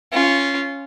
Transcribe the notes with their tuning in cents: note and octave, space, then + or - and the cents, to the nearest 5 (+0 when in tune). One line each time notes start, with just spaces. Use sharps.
C#4 +0 F4 -15